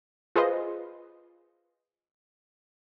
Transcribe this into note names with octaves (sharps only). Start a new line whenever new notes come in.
F4 G#4 B4 C5 D#5